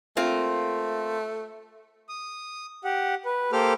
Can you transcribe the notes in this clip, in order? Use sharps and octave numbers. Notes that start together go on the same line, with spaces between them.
A3 A#3 C4 F4
D#6
G4 F#5
B4
A#3 G4 A4 C5 D6 F6